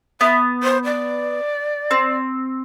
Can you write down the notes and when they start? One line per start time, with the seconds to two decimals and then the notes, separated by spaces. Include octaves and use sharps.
0.21 B3 E5
0.63 C5
0.84 D5
1.91 C4